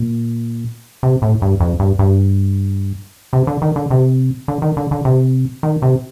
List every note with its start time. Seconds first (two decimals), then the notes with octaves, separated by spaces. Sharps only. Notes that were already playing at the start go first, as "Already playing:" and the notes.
Already playing: A#2
1.03 C3
1.22 A2
1.42 G2
1.60 F2
1.80 G2
1.99 G2
3.33 C3
3.47 D3
3.62 D#3
3.76 D3
3.90 C3
4.48 D3
4.62 D#3
4.77 D3
4.91 D3
5.05 C3
5.63 D#3
5.82 C3